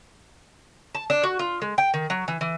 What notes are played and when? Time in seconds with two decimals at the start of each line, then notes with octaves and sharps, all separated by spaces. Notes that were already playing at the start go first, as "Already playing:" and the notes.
0.95 A5
1.10 D4
1.23 F#4
1.39 F4
1.62 G#3
1.78 G5
1.94 D#3
2.10 F#3
2.28 E3
2.41 E3